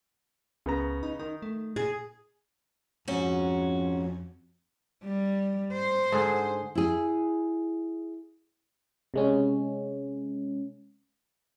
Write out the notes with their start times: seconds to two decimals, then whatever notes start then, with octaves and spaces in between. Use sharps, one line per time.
0.66 C#2 C#3 B3 A#5
1.03 D#4
1.19 D#3 D#4
1.42 A3
1.76 A#2 G#4
3.08 F2 G#2 C#4 F#4
5.04 G3
5.73 C5
6.12 G#2 D3 G#4
6.75 E4 G#4
9.14 C3 G#3 C#4